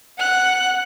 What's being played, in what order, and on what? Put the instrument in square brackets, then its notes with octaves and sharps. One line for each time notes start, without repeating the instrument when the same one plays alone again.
[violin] F#5 F#6